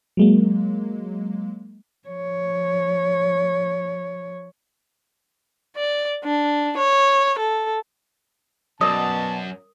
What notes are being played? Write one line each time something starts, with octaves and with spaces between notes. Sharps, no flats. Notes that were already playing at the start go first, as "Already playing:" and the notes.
F#3 G#3 A#3
F3 C#5
D5
D4
C#5
A4
F#2 B2 A#4 D5 D#5 A5 D#6